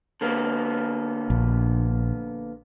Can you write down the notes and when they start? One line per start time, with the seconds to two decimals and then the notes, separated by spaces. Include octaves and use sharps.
0.21 D3 A#3 B3
1.30 A#1